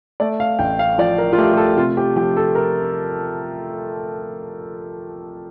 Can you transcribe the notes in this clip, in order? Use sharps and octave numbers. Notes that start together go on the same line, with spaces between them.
A3 D5
F5
A1 G5
F5
F3 D5
A#4
F4
A3 G4
G4
A4
C3 F4
G4
F3 G4
A4
A#4